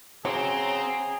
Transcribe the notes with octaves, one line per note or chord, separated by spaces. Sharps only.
C#3 F#3 C4 G#4 A#5 C6